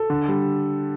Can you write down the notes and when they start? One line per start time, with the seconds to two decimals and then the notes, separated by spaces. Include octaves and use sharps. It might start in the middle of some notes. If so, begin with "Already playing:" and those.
Already playing: A4
0.10 D3
0.28 G3